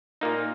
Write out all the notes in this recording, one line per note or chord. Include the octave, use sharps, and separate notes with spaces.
A#2 A#3 D#4